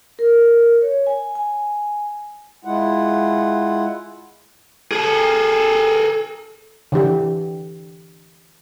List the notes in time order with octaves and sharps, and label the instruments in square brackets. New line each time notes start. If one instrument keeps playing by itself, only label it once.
[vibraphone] A#4
C#5
G#5
G#5
[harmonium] G#3 E4 F4 F#5
[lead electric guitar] G#4 A4
[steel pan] D3 E3 G4